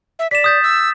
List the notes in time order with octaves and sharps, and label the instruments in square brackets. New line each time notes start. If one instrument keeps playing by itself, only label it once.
[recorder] E5
[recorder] D5 [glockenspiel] B6 E7
[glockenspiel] D#6 G6 A6
[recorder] E6